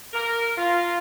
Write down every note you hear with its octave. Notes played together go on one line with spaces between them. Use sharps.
A#4
F4